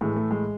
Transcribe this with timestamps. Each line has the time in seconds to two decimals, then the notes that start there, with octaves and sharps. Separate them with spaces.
0.01 A2 E3 G#3
0.16 A3
0.31 G#3